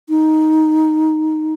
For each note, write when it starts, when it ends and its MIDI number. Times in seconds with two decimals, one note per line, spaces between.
0.09 1.54 63